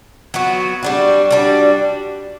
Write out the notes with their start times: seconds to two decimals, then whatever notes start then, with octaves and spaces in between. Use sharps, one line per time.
0.34 F#3 B3 F#4
0.83 G3 D4 F#4
1.31 G3 D4 F#4